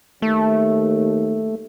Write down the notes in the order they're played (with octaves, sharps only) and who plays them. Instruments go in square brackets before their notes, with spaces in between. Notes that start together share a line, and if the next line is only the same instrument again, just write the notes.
[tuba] D#2 [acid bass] A3